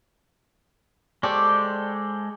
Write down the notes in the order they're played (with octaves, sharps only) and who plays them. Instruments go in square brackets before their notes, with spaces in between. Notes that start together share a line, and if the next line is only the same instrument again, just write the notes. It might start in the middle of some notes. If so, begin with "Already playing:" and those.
[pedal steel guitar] G#3 A4 C5 [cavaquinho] G4 D5 C#6